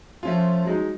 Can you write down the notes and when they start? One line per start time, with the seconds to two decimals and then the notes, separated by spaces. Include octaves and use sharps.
0.23 F3 A3 C#4 F4
0.65 F#3 G#3 D#4